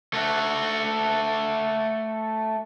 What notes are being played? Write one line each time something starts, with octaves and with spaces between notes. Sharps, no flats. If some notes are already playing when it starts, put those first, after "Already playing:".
A3 F#4